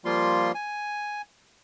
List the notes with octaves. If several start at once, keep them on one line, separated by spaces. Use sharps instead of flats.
F3 G3 A#3 F4 C6
G#5